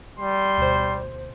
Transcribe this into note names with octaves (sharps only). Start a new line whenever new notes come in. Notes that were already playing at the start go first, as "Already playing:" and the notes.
G3 C6
D2 B2 C5